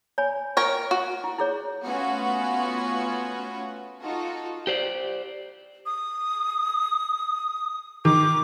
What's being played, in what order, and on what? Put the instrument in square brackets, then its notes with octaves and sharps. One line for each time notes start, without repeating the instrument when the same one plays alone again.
[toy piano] C#5 G#5 B5
[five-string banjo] A#4 C#5 G5 [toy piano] F5
[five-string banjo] F#4
[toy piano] E4
E4 G#4 C#5
[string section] A3 B3 C#4 F4 F#4
D#4 F4 F#4 A4
[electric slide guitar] G4 C5 D5
[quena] D#6
[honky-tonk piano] D#3 [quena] D6